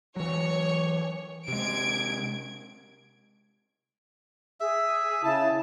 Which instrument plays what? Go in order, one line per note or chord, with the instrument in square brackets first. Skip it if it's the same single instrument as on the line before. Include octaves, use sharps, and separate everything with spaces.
[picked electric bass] E3 F#3 [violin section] C#5
[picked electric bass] C3 G#3 [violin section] G#6 D7
[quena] G#4 [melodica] E5
[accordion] C#3 A5 [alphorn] E4